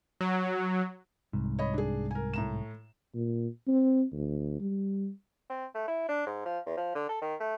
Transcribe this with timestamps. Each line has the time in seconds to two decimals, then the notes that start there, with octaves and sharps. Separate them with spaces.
0.21 F#3
1.33 C2 G#2
1.59 C#5 D#5 B5
1.74 D4 G#4
2.11 A#4 G#5
2.34 A2 A#5 E7
3.15 A#2
3.68 C4
4.13 D2
4.60 G3
5.50 C4
5.74 A3
5.88 E4
6.08 D4
6.26 G#2
6.45 F3
6.66 E2
6.77 F3
6.95 D3
7.09 A4
7.22 D#3
7.40 A3